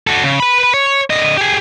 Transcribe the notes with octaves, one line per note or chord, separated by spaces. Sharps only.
F#4 A4
C#3
B4 B5
C#5
D3 D#5
G4 G#4